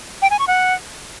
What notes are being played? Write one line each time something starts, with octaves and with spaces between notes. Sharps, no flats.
G5
G#5
C#6
F#5